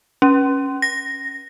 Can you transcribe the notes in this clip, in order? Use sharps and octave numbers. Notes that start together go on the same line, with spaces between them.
C#4
A#6